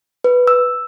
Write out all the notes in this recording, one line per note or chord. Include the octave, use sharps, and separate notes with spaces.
B4
E6